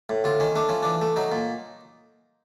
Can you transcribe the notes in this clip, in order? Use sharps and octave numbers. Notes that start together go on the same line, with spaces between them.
A2
D2 F4
D#3 C#4
A3 D4
F3 C#4
E3 D4
A3
F#3 D#4
A#2